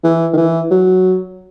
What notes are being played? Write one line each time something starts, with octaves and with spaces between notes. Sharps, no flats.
E3
D#3
E3
F#3